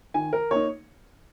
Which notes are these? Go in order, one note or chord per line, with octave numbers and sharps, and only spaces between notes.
D#3 G#5
A#4
A#3 D#4 C#5